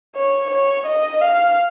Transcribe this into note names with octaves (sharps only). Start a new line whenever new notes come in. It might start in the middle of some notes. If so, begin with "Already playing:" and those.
C#5
C#5
D#5
F5